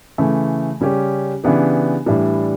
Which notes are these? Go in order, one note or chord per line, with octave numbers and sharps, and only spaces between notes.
C#3 E3 A3
C#3 G3 C#4 G4
C#3 E3 B3 D4 G4
A2 E3 G3 D4